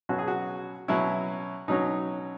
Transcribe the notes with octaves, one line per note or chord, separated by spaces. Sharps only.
B2 F#3 C#4 F#4
G#4
F#4
B2 F#3 C#4 E4
B2 F#3 C#4 D#4